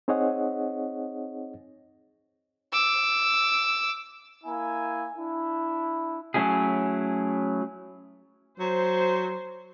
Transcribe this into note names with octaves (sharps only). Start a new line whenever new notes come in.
C4 D#4 G#4 C#5 D#5 F#5
D6 E6
A#3 E4 G#5
D4 E4
F#3 A3 C#4 E4 G#4
F#3 C5